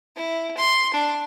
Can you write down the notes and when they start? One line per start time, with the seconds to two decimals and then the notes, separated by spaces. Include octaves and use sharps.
0.16 E4
0.57 C6
0.93 D4